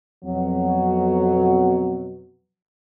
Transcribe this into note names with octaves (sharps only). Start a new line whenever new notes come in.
F2 B2 F#3